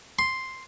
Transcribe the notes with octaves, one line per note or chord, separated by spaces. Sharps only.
C6